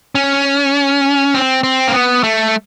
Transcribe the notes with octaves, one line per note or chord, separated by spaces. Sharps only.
C#4
C4
C4
A#3
B3
A3